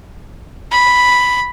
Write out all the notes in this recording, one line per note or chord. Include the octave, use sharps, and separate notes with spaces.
B5